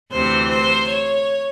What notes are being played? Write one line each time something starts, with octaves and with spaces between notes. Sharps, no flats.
D2 C3 E3 C5
C5
C#5